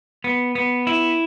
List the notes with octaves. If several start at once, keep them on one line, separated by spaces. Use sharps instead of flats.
B3
B3
E4